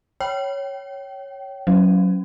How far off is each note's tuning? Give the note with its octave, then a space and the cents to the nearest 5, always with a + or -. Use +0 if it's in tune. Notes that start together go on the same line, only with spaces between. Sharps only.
C#5 +0 G5 -25
F#3 +0 C#4 +0